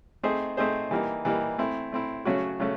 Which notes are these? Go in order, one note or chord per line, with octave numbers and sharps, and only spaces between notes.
A3 C4 D#4 G#4 C5
A3 C4 D#4 G#4 C5
E3 G3 A#3 D#4
E3 G3 A#3 D#4
A3 C4 E4
A3 C4 E4
C#3 F#3 A3 C#4 F#4
C#3 F#3 A3 C#4